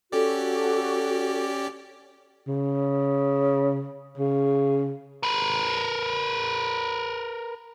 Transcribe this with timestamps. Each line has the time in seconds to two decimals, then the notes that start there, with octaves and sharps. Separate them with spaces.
0.12 C#4 F#4 G4 A4 D5
2.47 C#3
4.18 C#3
5.23 A#4 B4